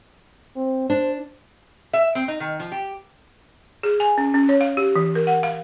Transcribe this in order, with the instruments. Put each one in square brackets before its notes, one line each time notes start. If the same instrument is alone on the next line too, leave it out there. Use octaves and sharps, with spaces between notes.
[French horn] C4
[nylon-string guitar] D4 [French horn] C5
[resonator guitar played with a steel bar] E5
C4
D#4
D#3
F3
G4
[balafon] G#4
G#5
C#4
C#4
C#5
F5
G4
E3
A#4
F#5
F5